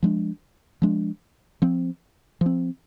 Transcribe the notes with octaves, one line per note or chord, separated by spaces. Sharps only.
F3 G#3 D4
F3 G#3 D4
F3 C4
F3 C4